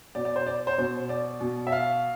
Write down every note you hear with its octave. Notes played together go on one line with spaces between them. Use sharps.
B2 D5
D5
C5
D5
C5
B2 C5
D5
B2
E5
F5